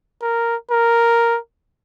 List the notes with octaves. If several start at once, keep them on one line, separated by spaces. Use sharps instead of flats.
A#4
A#4